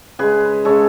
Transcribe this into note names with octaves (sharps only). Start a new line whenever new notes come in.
C#3 G#3 G#4 B4
C#3 G#3 A4 C#5